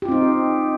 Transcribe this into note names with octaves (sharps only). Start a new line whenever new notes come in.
C4 D#4 F4 G4